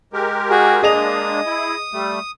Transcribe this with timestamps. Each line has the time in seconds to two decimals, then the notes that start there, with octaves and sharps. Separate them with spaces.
0.13 G#3 G4 A#4
0.50 F#4 G#4
0.83 G#3 A#3 D4 G#4 D#5 D#6 F7
1.46 E4
1.93 G3 A3